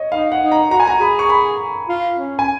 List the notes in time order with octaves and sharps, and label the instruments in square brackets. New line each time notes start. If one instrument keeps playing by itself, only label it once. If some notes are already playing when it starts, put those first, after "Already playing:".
Already playing: [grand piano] C#5 D#5
[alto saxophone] D#4 [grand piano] F5
[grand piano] F#5
[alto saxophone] D#4
[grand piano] A#5
[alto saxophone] F#4 [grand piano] A#5
[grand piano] G#5
[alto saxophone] F#4 [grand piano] A#5
[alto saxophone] G#4 [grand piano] B5
[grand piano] C#6
B5
[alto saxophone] F4
C#4
[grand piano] G#5